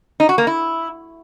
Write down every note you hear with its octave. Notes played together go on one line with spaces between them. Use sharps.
D#4
F#4
A#3
E4